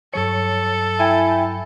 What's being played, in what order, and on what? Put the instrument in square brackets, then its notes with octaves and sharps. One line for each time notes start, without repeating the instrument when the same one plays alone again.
[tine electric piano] G2 F#3 C#7 [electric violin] A4 [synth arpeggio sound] C#5
[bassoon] E4 [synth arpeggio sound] G5 G#5